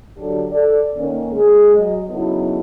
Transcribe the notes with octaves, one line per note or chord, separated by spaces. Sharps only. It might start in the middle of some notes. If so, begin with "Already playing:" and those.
D3 F#3 D4 G4 A4
A4 D5
D#3 A#3 C#4
G#3 G#4
F#3 D#5
C#3 F#3 B3 D#4 E4 A4